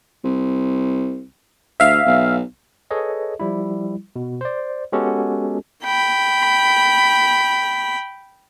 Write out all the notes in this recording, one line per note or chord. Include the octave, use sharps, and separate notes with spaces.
C2
D2 E5 F5
B1
G#4 A4 B4 C#5 D#5
F3 G3 E4
B2
C5 D5
G#3 B3 C#4 F#4 G4 A4
G5 B5